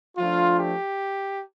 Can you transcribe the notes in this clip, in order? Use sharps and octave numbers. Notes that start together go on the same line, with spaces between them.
F3 A3 D4 F4
G4